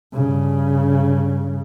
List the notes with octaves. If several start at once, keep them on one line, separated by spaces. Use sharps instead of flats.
G2 C#3